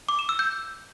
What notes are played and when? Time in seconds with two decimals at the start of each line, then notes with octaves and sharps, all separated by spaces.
0.09 D6
0.19 E7
0.29 E6
0.39 G6